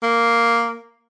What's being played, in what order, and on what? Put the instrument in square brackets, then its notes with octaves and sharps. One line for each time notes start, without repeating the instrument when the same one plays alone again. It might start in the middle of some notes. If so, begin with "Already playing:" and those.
[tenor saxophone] A#3